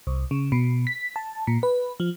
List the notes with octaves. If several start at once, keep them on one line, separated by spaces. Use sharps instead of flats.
C2
C#3
B2
B6
A5
A#2
B4
F3